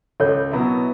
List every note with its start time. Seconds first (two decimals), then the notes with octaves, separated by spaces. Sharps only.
0.20 C#2 A4 C#5
0.51 B2 F#3 B3 E4